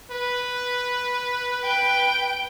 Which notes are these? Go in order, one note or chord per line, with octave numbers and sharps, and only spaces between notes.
B4
G5